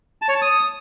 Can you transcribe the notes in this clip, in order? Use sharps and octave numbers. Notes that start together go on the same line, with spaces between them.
A5
C#5
A5
D#6